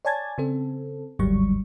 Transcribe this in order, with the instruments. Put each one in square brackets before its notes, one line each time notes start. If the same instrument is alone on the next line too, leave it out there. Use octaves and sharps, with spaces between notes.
[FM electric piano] C#5 D5 G#5 A5 G#6 A6
C#3 C4 A4
G1 D2 G#2 F#3 G3 C#6